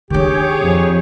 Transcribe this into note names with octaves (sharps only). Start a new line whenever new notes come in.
D#3 D4 G4 G#4 C#5
F2